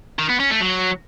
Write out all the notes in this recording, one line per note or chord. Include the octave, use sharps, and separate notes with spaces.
D#3
B3
C#4
A3
F#3